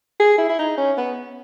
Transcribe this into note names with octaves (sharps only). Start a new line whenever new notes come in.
G#4
E4
E4
D#4
C#4
B3